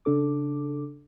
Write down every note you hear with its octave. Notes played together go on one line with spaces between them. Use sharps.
C#3 D4 A4 D6